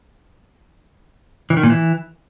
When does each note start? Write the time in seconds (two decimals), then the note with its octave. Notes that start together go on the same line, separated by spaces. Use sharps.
1.50 E3
1.57 D#3
1.63 A#2
1.70 E3